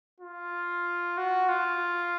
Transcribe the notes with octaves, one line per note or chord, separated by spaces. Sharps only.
F4
F#4
F4